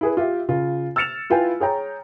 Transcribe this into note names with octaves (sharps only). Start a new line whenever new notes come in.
E4 G#4 B4
F4 G4 E5
C#3 F4
E6 F6 A6 C#7 E7 F7
E4 F4 B4 G5 G#5
G#4 C#5 G5 A#5